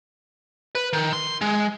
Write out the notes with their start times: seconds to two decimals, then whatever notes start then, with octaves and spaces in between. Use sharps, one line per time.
0.75 B4
0.93 D#3
1.13 C6
1.41 G#3